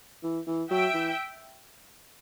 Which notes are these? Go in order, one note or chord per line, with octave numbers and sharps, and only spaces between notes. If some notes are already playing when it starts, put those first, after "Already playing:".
E3
E3
F#3 E5 G5
E3